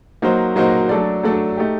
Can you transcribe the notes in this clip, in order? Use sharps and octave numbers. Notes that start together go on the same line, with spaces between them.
F#3 A#3 D#4 F#4 C5
F#3 A#3 D#4 F#4 C5
F#3 A3 D4 A4 D5
F#3 A3 D4 A4 D5
A3 D#4 G4